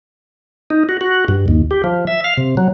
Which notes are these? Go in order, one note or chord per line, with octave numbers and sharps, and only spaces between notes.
D#4
F#4
F#4
G2
D#2
G4
F3
E5
F5
C3
F#3